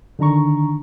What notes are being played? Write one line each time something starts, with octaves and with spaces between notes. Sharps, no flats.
D3 D#3 D4 A#5 C#6